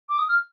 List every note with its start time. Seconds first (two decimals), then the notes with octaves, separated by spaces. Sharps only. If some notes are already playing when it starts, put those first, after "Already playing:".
0.09 D6
0.18 D#6
0.29 F6